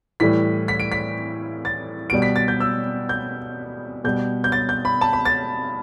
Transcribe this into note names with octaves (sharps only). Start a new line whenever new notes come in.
A2 E3 G3 B6
B6
D7
B6
A6
B2 G3 D7
B6
A6
G6
E6
G6
B2 G3 G6
G6
A6
G6
B5
A5
B5
A6